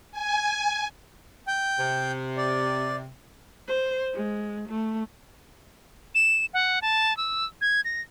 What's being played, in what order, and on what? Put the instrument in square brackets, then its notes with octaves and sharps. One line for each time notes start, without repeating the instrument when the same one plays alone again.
[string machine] G#5
[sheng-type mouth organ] G5
[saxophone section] C3
[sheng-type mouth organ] D5
[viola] C5
G#3
A3
[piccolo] E7
F#5
A5
E6
G#6
A#6